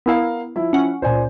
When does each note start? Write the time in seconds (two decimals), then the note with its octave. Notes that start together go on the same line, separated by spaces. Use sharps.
0.06 B3 E4 A#4 F5
0.56 F3 E4
0.73 C#4 F#5
1.02 C#2 A#2 C5 D5 G#5